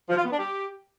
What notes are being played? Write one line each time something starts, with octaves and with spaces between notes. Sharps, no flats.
F3
F4
B3
D4
G4